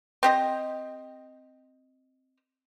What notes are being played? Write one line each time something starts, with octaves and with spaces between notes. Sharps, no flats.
C4 G4 D#5